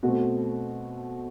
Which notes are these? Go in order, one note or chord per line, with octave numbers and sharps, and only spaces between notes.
B2 A3 C4 F#4